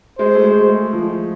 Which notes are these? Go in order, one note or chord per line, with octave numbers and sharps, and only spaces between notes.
G#3 C5
A3
G#3
G#3
F3